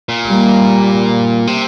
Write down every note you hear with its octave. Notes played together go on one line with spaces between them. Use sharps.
A#2
G3 A#3
C3